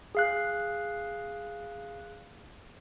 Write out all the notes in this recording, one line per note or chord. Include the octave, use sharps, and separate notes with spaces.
G#4 F5 F#6